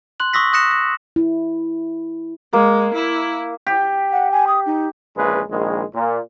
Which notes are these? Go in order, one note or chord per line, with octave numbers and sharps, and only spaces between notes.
C6 F#6 F#7
C#6 D#6 E6 A#6 B6
D#6 F#6 A#6 C#7 E7
A#6
E4
G#3 A#3
E4
G4
F#5
G#5
D#6
D#4
A#1 E2 C#3 G#3 B4
A#1 D#3 G#3
A#2